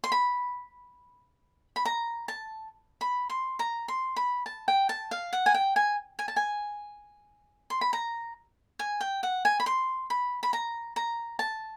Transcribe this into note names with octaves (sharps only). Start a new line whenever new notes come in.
C6
B5
B5
A#5
A5
B5
C6
A#5
C6
B5
A5
G5
A5
F5
F#5
G#5
G5
G#5
G#5
A5
G#5
C6
B5
A#5
G#5
G5
F#5
G#5
B5
C6
B5
B5
A#5
A#5
A5